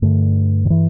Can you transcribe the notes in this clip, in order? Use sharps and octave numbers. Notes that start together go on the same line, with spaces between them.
G2 D3 A3
D3
E3